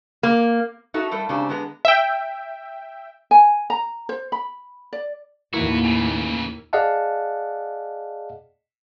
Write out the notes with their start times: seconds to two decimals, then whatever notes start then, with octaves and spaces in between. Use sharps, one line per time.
0.23 A#3
0.94 D#4 F#4 A4 E5
1.11 G3 A3 A4 A#4
1.29 G#2 C#3 C4 D4 G4
1.49 D3 G#3 B3 F4 A#5
1.85 E5 G5
3.31 G#5
3.70 A#5
4.09 C5
4.32 B5
4.93 D5
5.53 D#2 A2 A#3 E4 F#4 B4
5.84 C#3 E3
6.73 G#4 D5 D#5 F5 F#5 A5